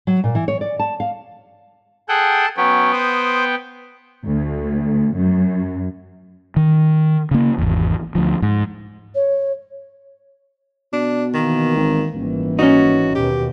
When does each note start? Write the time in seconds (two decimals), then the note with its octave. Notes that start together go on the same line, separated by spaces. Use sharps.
0.07 F#3
0.24 A#2
0.35 E3
0.48 C#5
0.61 D5
0.79 A5
1.00 F5
2.09 G#4 A4 F#5 G5 A5
2.57 F#3 B3 C#4 G5
2.93 C5 D#6
4.25 D2
5.17 F#2
6.56 D#3
7.31 C#3 A#3
7.58 G#1 E2
8.15 D2 F3
8.42 G#2
9.15 C#5
10.93 B2 D4
11.34 D#3 E3 A#3
11.76 G#1
12.15 D#1 G#1 E3
12.59 C#4 D#4 F#4
13.15 D#2 B2 G4